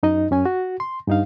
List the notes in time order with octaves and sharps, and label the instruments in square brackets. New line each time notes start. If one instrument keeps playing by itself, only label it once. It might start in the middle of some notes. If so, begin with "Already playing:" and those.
[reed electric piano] F#2 D#4 D#5
F#2 C#4 G#5
F#4
C6
G2 D#4 F5